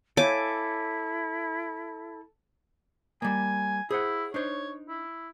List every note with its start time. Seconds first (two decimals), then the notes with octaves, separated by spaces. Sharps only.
0.17 E4 A4 C#5 F5 G#5 D6
3.22 G3 A#3 G#5
3.91 E4 G#4 C5 F#5
4.34 D4 D#4 C5 C#5
4.88 E4